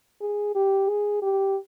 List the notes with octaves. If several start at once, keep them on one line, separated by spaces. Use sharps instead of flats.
G#4
G4
G#4
G4